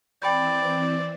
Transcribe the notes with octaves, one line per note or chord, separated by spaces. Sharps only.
E3 C4 D5 G5 B5 G6